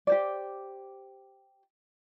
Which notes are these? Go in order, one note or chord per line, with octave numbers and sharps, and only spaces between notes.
G4 C5 D5